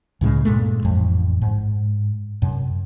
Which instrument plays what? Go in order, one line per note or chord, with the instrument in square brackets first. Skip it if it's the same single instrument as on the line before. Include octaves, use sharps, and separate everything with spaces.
[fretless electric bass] C#2 A2 C#3 G#3
G2 A#2 G#3 A3
A1 F2
G#2
F#2 C3